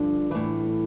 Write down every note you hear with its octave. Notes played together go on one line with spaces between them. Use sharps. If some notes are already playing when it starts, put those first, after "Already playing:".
Already playing: G2 D3 F3
A2 E3